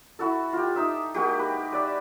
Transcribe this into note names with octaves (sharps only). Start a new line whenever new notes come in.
E4 F#4 A4
F4 G4
D#4 E5
G#3 A#3 F#4 G4
B4
B4 D5 E5